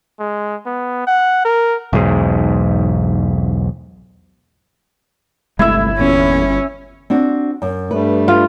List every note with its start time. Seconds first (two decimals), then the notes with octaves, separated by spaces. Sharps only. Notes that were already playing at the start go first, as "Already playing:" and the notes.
0.20 G#3
0.66 B3
1.07 F#5
1.45 A#4
1.93 B1 E2 G#2
5.59 G1 C2 G#3 A3 E4 E5
5.99 E2 A#2 C#4
7.10 C4 D4 F#4
7.62 F#2
7.91 G2 G3 A3 B4
8.28 F4